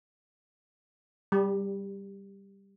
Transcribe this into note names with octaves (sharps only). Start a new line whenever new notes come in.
G3